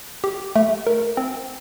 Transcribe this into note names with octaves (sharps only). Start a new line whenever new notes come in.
G4
A3
A#4
C4